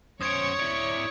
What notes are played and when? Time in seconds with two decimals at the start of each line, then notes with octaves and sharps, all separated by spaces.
0.21 F#2 C5 C#5 C#6 D#6 G#6 D7
0.59 E4 D5